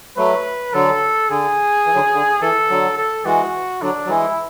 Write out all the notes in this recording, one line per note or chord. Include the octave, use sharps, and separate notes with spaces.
F#3 A3 B4
D3 F#3 A4
D3 G#4
E3
D3 F#3
D3
E3 A4
D3 F#3
A4
E3 G#3 F#4
D3 F#3 D4
F#3
E3 G#3 E4